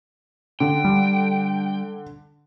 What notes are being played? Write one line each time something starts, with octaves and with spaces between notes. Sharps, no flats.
D3 G5
G3